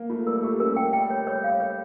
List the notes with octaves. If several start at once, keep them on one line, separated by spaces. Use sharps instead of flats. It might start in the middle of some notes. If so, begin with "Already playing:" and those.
Already playing: A#3
A3 F4
G3 A#4
A3 G4
C#4 A#4
A3 G5
G3 G5
C#5
C#5
F5
C#5